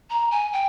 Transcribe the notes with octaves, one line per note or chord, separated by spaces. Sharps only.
A#5
G#5
G5